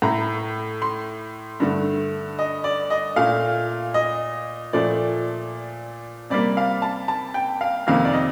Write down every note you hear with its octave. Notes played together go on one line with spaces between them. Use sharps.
A2 A3 A#5
C6
G2 D3 A3
D#5
D5
D#5
A#2 A3 F5
D#5
A#2 F3 A3 D5
C3 G3 A#3 D5
F5
A5
A5
G5
F5
F2 C3 D#3 A#3 F5
D5
D#5